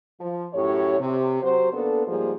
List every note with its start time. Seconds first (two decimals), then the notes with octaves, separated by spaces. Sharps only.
0.20 F3
0.53 F#2 A2 G4 C#5
0.99 C3
1.42 F#3 F#4 G4 C5
1.72 A#3 B3 D4 A4
2.06 G#2 F3 G3 G#3 A#3 G#4